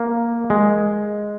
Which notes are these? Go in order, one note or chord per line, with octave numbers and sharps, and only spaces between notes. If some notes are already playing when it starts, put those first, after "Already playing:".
Already playing: A#3
G#3